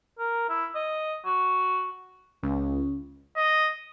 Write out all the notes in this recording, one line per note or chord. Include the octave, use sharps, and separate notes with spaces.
A#4
E4
D#5
F#4
C#2 C#3
D#5